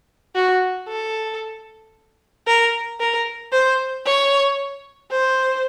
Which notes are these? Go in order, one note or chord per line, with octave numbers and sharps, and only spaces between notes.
F#4
A4
A#4
A#4
C5
C#5
C5